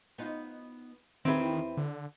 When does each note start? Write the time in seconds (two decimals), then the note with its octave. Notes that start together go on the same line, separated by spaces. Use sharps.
0.18 B3 D#4 F4
1.25 E2 D#3 C4 E4 G4 B4
1.77 D3